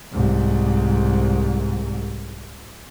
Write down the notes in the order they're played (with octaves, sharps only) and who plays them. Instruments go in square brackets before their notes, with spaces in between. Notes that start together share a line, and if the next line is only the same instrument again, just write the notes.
[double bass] C2 G#2